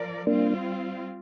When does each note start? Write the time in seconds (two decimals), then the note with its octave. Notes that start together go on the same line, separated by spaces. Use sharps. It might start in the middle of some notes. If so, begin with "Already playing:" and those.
Already playing: F3 A#4 D5
0.27 G3 A#3 C4 D4 F4